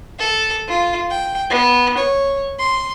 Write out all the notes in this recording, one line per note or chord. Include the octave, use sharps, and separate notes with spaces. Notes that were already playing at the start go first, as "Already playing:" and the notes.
A4
F4
G5
B3
C#5
C6